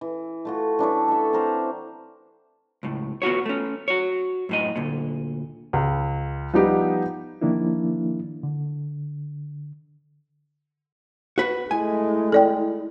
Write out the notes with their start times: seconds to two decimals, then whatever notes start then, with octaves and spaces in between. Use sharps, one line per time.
0.01 E3
0.45 A3 F4 F#4
0.79 E3 D4 E4 C#5
1.08 A4 E5
1.33 C4 A#4 C5
2.83 C#2 A2
3.22 B3 F4 F#4 C#5
3.46 A3 C#4
3.88 F#4 C#5
4.49 F#2 A2 D#5
4.76 D2 A#2
5.73 C#2
6.53 F3 G3 B3 D#4 G4
7.42 D#3 F3 A#3 D4 E4
8.43 D3
11.38 F#4 B4
11.71 G#3 A3 E4 G#5
12.32 A4 D5 G5